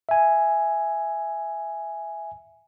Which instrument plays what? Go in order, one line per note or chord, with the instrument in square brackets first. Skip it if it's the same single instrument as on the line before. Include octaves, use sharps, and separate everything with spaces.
[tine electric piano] E5 G#5